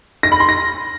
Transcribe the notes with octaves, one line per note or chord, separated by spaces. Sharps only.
A#6
B5
C6
A#6